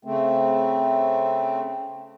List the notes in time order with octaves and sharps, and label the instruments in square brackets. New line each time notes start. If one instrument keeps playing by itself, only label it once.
[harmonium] C#3 A3 C4